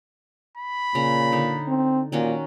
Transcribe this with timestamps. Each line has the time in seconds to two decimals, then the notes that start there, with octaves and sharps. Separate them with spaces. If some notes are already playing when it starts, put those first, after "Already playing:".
0.57 B5
0.95 A#2 C#3 A#5
1.32 D3 D#4
1.68 C4
2.12 A#2 D#3 C#4 F#4